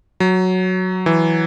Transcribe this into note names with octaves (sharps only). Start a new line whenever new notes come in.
F#3
E3